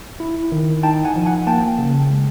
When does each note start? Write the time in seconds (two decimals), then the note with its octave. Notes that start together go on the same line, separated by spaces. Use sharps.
0.20 E4
0.52 D#3
0.83 D#4 G5 A5
1.05 F#5 G#5
1.16 F3
1.26 F#5 G#5
1.47 A#3 G5 A5
1.79 C#3
2.10 G#3